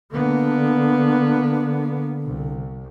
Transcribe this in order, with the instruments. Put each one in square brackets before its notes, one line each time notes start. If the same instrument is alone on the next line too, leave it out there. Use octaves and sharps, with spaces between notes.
[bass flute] D3 [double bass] A#3 B3
[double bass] C2